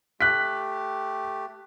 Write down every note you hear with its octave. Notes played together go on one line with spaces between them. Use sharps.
A3 G4 F#6 B6